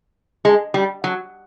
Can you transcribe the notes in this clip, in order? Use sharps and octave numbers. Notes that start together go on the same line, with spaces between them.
G#3
G3
F#3